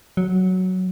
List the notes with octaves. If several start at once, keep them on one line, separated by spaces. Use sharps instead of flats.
F#3